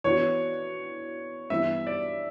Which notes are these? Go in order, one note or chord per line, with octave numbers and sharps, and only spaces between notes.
E3 B3 D4 F#4 C#5
G2 E3 G3 B3 E5
D5